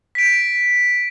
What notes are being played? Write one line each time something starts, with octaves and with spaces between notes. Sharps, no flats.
B6 D7